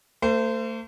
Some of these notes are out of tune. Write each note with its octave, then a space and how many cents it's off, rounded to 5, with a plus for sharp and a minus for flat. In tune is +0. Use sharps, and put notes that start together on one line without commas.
A3 +40 C5 -20